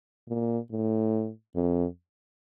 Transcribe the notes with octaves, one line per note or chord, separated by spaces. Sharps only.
A#2
A2
F2